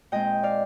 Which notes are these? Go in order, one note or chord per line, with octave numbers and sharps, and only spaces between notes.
A#2 G#3 C4 D#5 G5
D5 F5